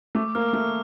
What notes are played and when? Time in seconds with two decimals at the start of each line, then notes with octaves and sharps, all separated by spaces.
0.15 A3 D6
0.35 A#3 F6
0.53 A3 F6